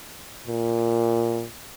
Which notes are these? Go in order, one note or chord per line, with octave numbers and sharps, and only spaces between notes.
A#2